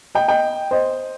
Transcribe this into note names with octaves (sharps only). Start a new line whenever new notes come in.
D#5 G5
D#5 G5
C5 D#5